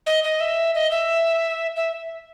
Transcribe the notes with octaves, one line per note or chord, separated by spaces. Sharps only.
D#5
D#5
E5
D#5
E5
E5